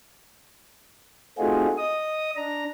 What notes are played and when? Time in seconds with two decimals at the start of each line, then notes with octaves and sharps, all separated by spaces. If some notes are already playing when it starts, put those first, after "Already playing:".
1.38 A3 C4 D#4 F4 F#4 G#4
1.78 D#5 D#6
2.36 D4 A#5